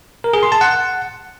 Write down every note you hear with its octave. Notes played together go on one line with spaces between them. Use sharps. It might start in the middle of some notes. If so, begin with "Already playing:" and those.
A#4
G#4
C6
A5
F#5